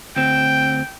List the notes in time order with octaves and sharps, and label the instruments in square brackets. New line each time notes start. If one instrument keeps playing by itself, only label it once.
[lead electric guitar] D2 C4 [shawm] G5